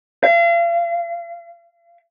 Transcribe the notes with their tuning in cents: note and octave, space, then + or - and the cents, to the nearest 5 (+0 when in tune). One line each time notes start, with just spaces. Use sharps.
F5 -40